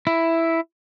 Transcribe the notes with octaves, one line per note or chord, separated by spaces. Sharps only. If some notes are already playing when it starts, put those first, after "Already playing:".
E4